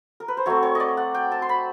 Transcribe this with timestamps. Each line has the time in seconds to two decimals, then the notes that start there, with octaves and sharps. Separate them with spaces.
0.20 A#4
0.28 B4
0.37 C5
0.46 F#3 A3 C4 C#5
0.63 C#5
0.75 D5 D#5
0.97 F#5
1.14 G5
1.32 A5
1.42 C6
1.49 B5